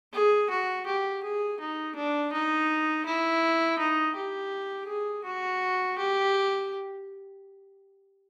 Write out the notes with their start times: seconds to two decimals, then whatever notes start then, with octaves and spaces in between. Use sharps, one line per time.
0.13 G#4
0.50 F#4
0.86 G4
1.23 G#4
1.60 D#4
1.95 D4
2.32 D#4
3.05 E4
3.78 D#4
4.15 G4
4.87 G#4
5.24 F#4
5.98 G4